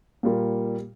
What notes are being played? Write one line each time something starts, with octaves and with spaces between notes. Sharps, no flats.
A#2 G3 A#3 F4 A#4